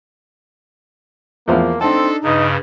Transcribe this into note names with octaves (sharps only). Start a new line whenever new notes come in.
E2 F3 A#3
C4 D4 D#4 A4 A5
G2 C#3 D#4 B4